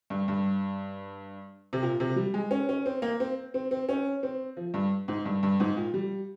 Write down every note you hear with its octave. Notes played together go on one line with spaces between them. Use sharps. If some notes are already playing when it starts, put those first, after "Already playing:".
G2
G2
C3
A#2
C3
G3
G#3
C#4
C#4
C4
A#3
C4
C4
C4
C#4
C4
F3
G2
G#2
G2
G2
G#2
A#2
G3